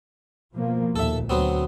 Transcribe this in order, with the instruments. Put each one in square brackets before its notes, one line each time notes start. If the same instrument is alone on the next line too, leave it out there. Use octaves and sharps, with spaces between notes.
[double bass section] B2 F3 A#3
[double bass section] D#2 A#2 [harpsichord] A4 E5
[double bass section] D2 [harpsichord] F#3 B3 C4